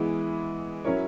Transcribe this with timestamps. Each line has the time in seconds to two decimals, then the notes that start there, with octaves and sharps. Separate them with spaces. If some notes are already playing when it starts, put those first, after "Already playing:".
Already playing: E3 G#3 B3 E4 G#4
0.84 F#3 C#4 E4 A#4 C#5